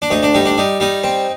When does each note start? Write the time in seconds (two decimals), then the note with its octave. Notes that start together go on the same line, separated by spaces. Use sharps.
0.02 D4
0.10 D2 D#4
0.23 D4
0.34 G3 D#4
0.45 D4
0.58 G3 D#4
0.80 G3 D#4
1.04 C4